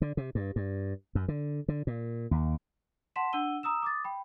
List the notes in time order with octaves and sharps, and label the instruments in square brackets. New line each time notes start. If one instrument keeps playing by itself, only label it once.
[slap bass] D3
C3
G2
G2
F#2
D3
D3
A#2
D#2
[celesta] F#5 A5 C6 B6 E7
D4 F#5 E6 D#7 G7
A#5 D#6 E6 E7
D6 D#6 A6
G5 B5